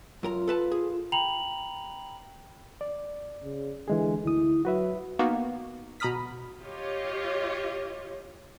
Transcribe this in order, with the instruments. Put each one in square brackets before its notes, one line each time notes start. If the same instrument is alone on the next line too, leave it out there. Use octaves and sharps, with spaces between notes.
[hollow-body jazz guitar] F#2 A#4 A#5 [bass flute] F4
[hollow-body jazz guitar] A4 B4 A5
G#4
[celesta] G5 A#5 B5 F7 F#7
[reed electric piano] D5
[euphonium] C#3
[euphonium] D3 [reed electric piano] E3 G#3 G#4
[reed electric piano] D2 D#6 [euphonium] E4
[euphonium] F#3 [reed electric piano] F#4 B4 E5
[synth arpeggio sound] A#3 B3 D#4 F#4
B2 A#5 B5 D#6 F6 B6
[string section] F4 G4 C#5 D#5